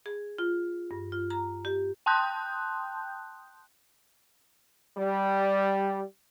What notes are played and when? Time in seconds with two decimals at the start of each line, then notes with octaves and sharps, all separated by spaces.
0.06 G#4
0.38 F4
0.91 G2
1.12 F4
1.30 A#5
1.65 G4
2.06 G5 A5 C6 D#6 F#6 G6
4.97 G3